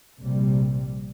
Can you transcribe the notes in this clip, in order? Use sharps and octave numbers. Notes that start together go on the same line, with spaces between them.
A#1 C3 G3